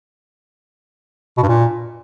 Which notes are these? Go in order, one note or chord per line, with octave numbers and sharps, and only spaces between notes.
B2
G2
A#2